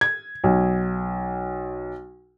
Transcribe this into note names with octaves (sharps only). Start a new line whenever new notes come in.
G#6
B1